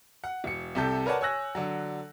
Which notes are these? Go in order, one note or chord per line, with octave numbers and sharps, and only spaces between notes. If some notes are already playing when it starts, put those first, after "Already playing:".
F#5
E1 C#7
C2 C3 A4 G6
A#4 B4 C#5 D5 F#5 A5
C#5 G#5 E6 F#6 A#6
D3 F#3